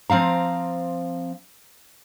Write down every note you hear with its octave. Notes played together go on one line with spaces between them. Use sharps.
F3 C4 F5 A#5